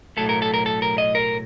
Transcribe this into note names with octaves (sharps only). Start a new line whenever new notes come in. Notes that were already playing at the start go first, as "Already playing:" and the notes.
B1 A2 F#3 A3 A4
A#4
A4
A#4
A4
A#4
D#5
A#4